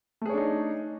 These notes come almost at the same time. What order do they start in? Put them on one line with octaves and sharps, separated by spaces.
A3 G#4 C#5 D4 D#4